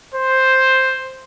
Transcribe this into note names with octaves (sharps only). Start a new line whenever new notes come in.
C5